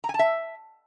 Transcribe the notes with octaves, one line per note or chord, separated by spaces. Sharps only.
A#5
G#5
A5
E5